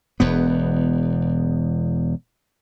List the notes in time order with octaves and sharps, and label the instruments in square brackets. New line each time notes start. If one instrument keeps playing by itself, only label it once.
[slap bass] E1 E2 B3